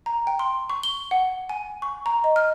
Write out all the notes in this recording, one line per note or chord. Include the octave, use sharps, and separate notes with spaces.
A#5
G5
C6
C#6
G7
F#5
G#5
C#6
A#5
D#5
F6